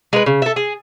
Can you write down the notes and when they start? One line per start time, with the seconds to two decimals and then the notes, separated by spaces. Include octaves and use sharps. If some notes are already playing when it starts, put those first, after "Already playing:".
0.13 G#3 B4
0.26 C#3
0.42 A4 E5
0.56 G#4